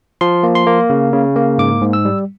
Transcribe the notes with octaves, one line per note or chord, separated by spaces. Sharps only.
F3 C6
A#3
C6
A#3
C#3
C#3
A#3
G#2 D6
G#2
E6
G3